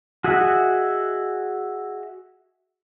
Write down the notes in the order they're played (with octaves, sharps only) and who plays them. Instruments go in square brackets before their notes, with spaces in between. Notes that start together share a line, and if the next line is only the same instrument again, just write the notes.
[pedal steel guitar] F#4 G#4 D#5 E5 F#5